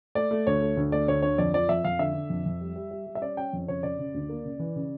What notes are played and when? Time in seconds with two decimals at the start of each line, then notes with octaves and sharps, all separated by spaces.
0.15 A3 D5
0.31 A3
0.47 D2 C#5
0.62 A3
0.77 D2
0.92 A3 D5
1.08 D2 C#5
1.22 D3 C#5
1.38 F2 D5
1.53 F3 D5
1.69 F2 E5
1.85 F2 F5
1.99 D3 E5
2.15 D3
2.30 F2
2.46 F2
2.61 G3
2.76 G3
2.91 G3
3.07 G3
3.15 E5
3.22 C#4 D5
3.37 C#4 G5
3.53 F2
3.68 C#3 C#5
3.83 C#3 D5
3.99 C#3
4.14 D2
4.29 A#3
4.45 C#3
4.59 E3
4.76 C#3